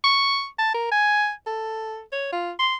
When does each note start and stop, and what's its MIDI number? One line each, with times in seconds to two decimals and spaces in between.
0.04 0.46 85
0.59 0.73 81
0.74 0.89 70
0.92 1.31 80
1.46 2.01 69
2.12 2.30 73
2.33 2.52 65
2.59 2.75 84